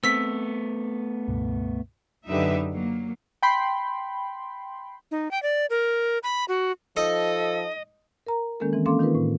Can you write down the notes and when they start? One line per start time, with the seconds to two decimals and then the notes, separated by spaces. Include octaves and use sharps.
0.04 A3 B3 C4 E6 B6
1.28 C#2 G2 B2
2.27 F#2 D3 D#4 G4 B4 E5
2.72 F#3 A#3
3.43 G5 B5 C6
5.11 D#4
5.31 G5
5.43 D5
5.70 A#4
6.23 B5
6.48 F#4
6.97 F3 D#4 A4 D#5
8.27 A#4 A#5
8.60 D#3 G#3 A#3 C#4 A4 A#4
8.73 E3 C4
8.86 A#3 C#4 A4 F5 C6 D6
8.99 D#3 D#4 F4 A#4 B4
9.15 A2